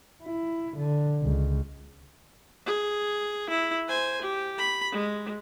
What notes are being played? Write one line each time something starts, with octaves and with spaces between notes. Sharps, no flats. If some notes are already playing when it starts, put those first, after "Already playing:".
E4
D3
C#2
G#4
E4
C5 G#5
G4
B5
G#3